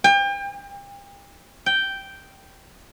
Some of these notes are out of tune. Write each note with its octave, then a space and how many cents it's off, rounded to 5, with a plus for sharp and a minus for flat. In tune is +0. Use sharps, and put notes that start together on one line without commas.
G5 +35
G5 -5